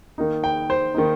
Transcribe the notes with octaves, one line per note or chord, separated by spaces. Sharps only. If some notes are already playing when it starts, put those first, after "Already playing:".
D#3 A#3 D#4
G5
C5
D#3 A#3 D#4